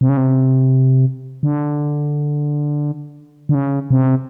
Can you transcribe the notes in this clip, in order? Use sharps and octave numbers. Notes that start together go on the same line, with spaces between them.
C3
C#3
C3
D3
D3
C#3
C3